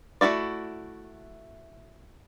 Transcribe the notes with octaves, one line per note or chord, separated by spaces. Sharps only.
A3 E4 F#4 D5